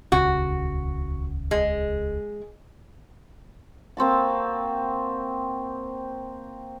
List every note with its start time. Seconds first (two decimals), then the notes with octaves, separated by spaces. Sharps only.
0.12 D#1 C#2 C#3 F#4
1.51 G#3
3.97 A#3 C4 F#4 A5